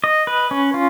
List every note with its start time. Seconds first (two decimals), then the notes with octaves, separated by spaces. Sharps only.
0.04 D#5
0.27 B4
0.51 C#4
0.74 F4